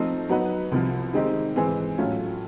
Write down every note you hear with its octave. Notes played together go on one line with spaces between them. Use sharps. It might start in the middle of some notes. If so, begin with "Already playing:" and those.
Already playing: F3 A3 C4 D#4
F#3 B3 D#4 F#4 B4
C2 C3 F3
D#3 G#3 C4 D#4 G4
G#2 E3 G#3 C4
A2 F#3 A3 C#4 F4